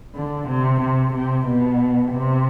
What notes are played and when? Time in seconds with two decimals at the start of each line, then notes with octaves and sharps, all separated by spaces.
0.15 D3
0.48 C3
0.81 C3
1.13 C3
1.46 B2
2.11 C3